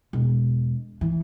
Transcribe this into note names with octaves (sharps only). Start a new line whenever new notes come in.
E1
E3